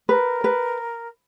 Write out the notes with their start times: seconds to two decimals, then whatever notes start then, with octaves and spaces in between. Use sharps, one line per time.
0.09 A#4 B4
0.44 B4